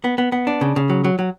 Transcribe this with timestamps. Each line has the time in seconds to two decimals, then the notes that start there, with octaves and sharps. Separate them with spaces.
0.04 B3
0.18 B3
0.32 B3
0.47 D4
0.61 C#3
0.76 C#3
0.90 F#3
1.04 F#3
1.19 F#3